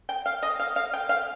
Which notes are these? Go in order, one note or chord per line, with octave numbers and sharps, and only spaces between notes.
G5
F5
D#5
F5
F5
G5
F5